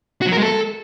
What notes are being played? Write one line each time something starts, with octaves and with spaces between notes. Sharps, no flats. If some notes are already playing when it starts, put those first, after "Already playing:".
F#4
F#3
A#4
G#3
A4